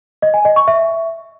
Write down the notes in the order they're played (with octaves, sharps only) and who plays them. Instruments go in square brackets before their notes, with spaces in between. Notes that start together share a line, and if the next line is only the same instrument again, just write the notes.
[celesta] D#5
G#5
D#5
C#6
E5